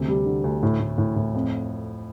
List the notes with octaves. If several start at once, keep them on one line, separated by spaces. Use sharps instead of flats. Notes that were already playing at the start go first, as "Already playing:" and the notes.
Already playing: D2 C3
G3
D3
D2
A2
A2
A2
A2
F2